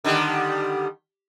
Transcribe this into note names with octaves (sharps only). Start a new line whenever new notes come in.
D3 D#3 G3